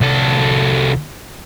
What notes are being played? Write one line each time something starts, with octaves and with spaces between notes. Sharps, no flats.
C2 A4